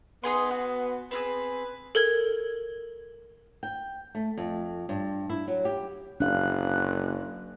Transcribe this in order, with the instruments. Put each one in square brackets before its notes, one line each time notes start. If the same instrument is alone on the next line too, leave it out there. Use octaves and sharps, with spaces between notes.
[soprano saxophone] B3 [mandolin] D#4 G#4 C6
[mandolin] F#4
[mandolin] C4 F4 G#4 [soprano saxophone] B4
[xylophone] A4 A#4 G#6
[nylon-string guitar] G5
A3
F2
G2
E4
F#3
G4
[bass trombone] F#1 [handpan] D4 F5 [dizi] F#6